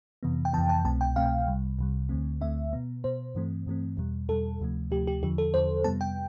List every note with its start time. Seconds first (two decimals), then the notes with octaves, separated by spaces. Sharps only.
0.23 F2 C3 E3 B3
0.45 G5
0.53 F2 C3 E3 B3 A5
0.69 G5
0.84 C2 B2 A3 C4 A5
1.01 G5
1.16 C2 B2 A3 C4 F5
1.47 C2 C3 G3
1.79 C2 C3 G3
2.09 D2 D3 A3 C4
2.41 D2 D3 A3 C4 E5
2.73 B2 B3
3.04 B2 B3 C5
3.35 G2 E3 A3 C4
3.66 G2 E3 A3 C4
3.97 E2 B2 G3
4.29 E2 B2 G3 A4
4.60 D2 C3 F3 A3
4.91 D2 C3 F3 A3 G4
5.07 G4
5.23 E2 D3 F3 G4
5.38 A4
5.54 E2 D3 F3 C5
5.84 F2 C3 G3 B3 A5
6.01 G5